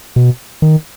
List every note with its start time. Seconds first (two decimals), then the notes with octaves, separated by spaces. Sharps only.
0.16 B2
0.62 D#3